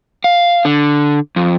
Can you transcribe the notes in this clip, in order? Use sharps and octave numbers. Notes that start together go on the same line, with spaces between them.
F5
D3
F2